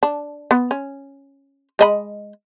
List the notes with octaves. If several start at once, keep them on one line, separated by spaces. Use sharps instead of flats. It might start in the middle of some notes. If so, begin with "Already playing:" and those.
D4
B3
C#4
G#3 D#5 B5